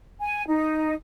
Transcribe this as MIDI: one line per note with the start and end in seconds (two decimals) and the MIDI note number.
0.21 0.43 80
0.48 0.94 63